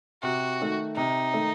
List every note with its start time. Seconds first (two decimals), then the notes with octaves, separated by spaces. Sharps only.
0.23 C3 F#4
0.60 D#3 A3
0.96 C3 D#4
1.34 D#3 A3